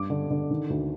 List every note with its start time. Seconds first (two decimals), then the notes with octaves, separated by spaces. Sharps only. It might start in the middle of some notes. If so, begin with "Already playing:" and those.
Already playing: G2 D6
0.10 D3
0.31 D3
0.51 D#3
0.70 D2